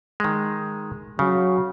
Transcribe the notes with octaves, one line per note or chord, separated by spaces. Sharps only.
D#3 G#3
C#3 F#3